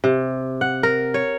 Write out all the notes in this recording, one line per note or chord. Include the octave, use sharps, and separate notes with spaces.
C3
F#5
A#4
C#5